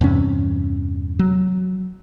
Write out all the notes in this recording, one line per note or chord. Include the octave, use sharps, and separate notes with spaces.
E2 G2 C3 C#4
F#3